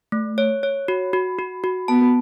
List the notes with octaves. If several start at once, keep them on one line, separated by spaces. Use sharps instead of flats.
A3
C#5
C#5
F#4
F#4
F#4
F#4
B3 A5